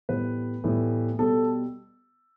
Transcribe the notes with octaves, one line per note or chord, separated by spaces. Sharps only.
A2 E3 G3 B3 B4
A2 E3 G3 B3
B2 G3 B3 A4